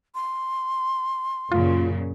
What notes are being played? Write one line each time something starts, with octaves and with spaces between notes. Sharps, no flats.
C6
F#2 A#2 C#3 F4